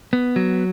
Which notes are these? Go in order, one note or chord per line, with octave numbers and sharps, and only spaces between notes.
B3
F#3